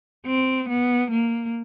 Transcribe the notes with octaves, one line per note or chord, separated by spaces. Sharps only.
C4
B3
A#3